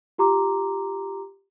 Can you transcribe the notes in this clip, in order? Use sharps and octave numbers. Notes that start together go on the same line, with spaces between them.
F4 G4 A#5 C6 D6